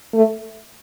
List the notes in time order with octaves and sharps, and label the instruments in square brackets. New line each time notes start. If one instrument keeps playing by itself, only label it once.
[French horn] A3